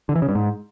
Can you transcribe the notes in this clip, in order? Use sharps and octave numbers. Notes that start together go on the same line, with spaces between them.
D3
E3
C#3
G2
G#2